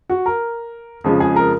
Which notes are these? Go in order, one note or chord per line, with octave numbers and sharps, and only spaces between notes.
F#4
A#4
F2 C#3 F3 G#3
G#4
A#4